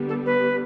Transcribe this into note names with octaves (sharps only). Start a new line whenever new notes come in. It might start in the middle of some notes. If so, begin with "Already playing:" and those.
Already playing: D3 G3 B3
A4
B4